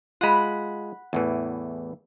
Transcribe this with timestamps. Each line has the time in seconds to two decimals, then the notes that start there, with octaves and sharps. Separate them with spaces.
0.21 G#3 F4 F#5 B5
1.13 E2 A2 E3